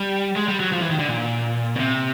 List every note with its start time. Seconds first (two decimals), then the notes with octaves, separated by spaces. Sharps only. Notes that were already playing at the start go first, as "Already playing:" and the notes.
Already playing: G3
0.36 G#3
0.48 G3
0.60 F#3
0.72 F3
0.81 E3
0.90 D#3
0.99 D3
1.09 A#2
1.76 B2
1.80 C3